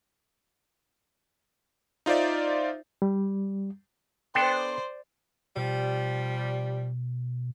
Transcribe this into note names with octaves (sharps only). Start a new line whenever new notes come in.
D#4 F4 C5 D5 E5
G3
B3 D4 A4 C5 D5 G5 C6
B2 F3 G3